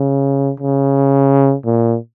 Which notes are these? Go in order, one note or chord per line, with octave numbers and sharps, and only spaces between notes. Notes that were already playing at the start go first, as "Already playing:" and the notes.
Already playing: C#3
C#3
A#2